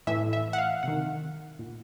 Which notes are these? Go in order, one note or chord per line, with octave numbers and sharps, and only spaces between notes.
A2 E3 E5
E5
F#5
F5
C3 D#3 F#5
A#2